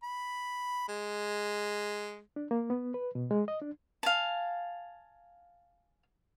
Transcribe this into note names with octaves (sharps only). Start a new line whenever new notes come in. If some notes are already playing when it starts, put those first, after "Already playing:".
B5
G#3
D4
A#3
B3
B4
B2
G#3
D#5
D4
F5 G#5 A5